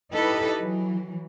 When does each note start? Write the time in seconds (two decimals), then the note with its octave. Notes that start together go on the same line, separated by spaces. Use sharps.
0.13 D#4 E4 G4 A4 B4 D#5
0.59 E3 F#3